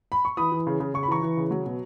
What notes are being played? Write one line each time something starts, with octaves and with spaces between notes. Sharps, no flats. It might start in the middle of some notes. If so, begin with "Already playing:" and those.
B5
C#6
E3 B5 D#6
E3
C#3
C#3
C#3 C#6
B5
E3 A#5 C#6
E3
C#3
F#3
B2